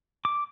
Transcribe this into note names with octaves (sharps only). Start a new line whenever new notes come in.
D6